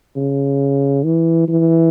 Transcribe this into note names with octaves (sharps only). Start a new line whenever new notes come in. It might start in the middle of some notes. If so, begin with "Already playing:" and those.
C#3
E3
E3